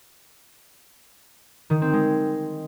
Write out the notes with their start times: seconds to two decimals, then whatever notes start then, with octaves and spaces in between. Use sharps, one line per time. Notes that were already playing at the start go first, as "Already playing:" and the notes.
1.70 D#3
1.82 C4
1.93 G#3